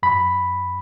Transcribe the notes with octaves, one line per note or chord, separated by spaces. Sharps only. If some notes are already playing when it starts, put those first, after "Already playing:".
F#2 B5